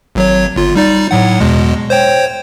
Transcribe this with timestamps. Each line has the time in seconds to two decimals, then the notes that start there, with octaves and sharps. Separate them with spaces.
0.15 G#1 F#3 C#5
0.56 G1 F4
0.76 G3 D#4 D5
1.11 A2 F#3 F#5
1.40 E2 B2 G#3
1.90 C5 C#5 G5